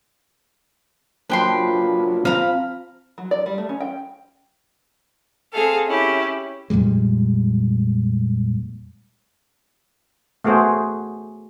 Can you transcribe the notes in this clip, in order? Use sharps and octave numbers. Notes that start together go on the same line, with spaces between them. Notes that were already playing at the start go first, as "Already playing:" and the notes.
F3 F#3 A#3 D4 B4 G5 C6
C4 F5 A#5 B5
F#3
D5
G3
A3
C#4
G5
C4 G#4 A4 F5
C#4 E4 G4
F2 A#2 G3 G#3
A3 B3 F#4 G#4 C5